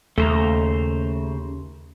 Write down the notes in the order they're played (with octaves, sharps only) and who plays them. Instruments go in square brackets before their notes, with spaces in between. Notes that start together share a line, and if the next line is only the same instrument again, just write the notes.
[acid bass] D#2 [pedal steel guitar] C#3 C5 A#5 [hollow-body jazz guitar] A3